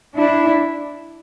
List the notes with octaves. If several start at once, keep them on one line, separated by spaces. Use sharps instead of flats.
D4 E4